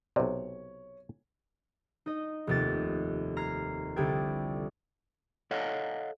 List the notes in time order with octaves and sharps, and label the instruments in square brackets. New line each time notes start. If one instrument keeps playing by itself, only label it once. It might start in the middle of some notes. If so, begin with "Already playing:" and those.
[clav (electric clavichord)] B1 C3 [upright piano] C#5
[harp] D#4 D#5
F1 D#2 A6
A#5 F6 G#6 C7
C2 D3 G3 A4 G5 G#6
[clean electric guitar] A4 C#5 D#5 F5 F#5